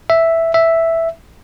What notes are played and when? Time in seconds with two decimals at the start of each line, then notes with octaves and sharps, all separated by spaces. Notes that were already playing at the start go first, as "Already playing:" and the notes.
0.10 E5
0.54 E5